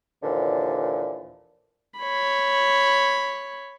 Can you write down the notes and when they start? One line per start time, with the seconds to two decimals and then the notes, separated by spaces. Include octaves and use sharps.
0.23 D#2 A#2 D3 E3 F3
1.99 C#5 B5